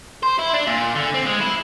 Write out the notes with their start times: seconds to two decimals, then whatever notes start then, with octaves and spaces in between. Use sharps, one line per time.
0.23 C5
0.39 E4
0.54 D4
0.67 A#2
0.95 D3
1.14 C4
1.26 G#3
1.40 E4